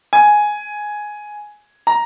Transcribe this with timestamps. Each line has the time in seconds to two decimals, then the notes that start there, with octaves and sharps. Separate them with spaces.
0.13 G#5
1.87 A#5